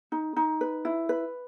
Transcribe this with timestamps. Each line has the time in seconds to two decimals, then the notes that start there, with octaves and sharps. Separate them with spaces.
0.12 D#4
0.36 D#4
0.61 B4
0.85 E4
1.09 B4